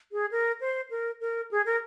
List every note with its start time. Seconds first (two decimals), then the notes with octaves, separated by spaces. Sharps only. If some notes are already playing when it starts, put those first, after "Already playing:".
0.12 G#4
0.31 A#4
0.61 C5
0.91 A#4
1.21 A#4
1.51 G#4
1.66 A#4